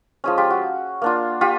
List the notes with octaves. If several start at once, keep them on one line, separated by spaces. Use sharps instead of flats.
F3 G#3 C#4
F4 G4
F#4
A#3 D4 F4
F4 G4